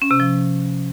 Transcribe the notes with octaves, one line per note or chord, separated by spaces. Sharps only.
C#4
C3
F3